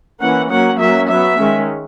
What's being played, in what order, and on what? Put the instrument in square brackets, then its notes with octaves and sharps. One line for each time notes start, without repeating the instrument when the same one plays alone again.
[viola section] E3 A#3 C#4 F#5
F#3 A#3 C#4 F#5
F#3 A#3 C#4 E5
F#3 B3 E5
D#3 G#3 C#4